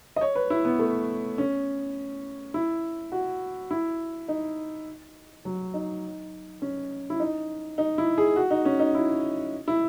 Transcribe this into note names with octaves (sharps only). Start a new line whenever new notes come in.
D#5
C#5
B4
E4
B3
A3
C#4
E4
F#4
E4
D#4
F#3
D#4
C#4
E4
D#4
D#4
E4
G#4
F#4
D#4
C#4
D#4
E4
E4